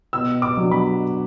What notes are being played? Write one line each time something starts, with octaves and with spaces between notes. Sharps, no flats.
B2 E6
D6
F#3 D4
B5